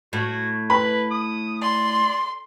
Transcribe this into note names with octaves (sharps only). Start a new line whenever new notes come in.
A2 F#4
B4 B5
D#6
D5 C6